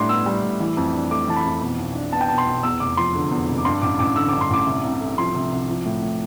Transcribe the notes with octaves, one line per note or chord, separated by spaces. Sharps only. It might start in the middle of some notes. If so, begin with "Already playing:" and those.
Already playing: A2 G3 D4 C6 D6
B3 E6
G3
A2
E3
F2
D4
A3 D6
E3 A5
B5
F2
B2
B1
D4
B3 A5
G5
B2 A5
C6
B1
E2 E6
F1 D6
F3 C6
D3
E2
F1
D6
G2 C6
A1 D6
A1 D6
D3 E6
G2 D6
C6
A1 D6
C3
C2
A3
F3 C6
C3
C2
F3
A2
A2